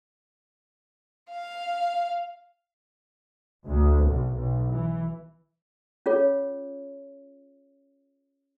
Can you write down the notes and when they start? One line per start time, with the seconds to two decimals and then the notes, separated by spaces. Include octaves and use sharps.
1.30 F5
3.66 D2
4.04 B1
4.35 B1
4.72 E3
6.06 C#4 F4 G#4 C#5